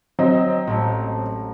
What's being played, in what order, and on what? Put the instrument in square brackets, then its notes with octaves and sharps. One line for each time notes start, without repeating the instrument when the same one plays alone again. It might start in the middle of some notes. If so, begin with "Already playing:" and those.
[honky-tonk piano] F#3 C4 D#5
[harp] A1